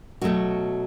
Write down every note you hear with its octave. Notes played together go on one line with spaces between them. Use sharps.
B2 F#3 A3 F#4